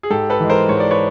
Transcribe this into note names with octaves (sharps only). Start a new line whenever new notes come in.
G#4
G#2 G4 A4
A4 B4
E3 G#3
A#4 C5
G#2 C#5
D5
B4 C#5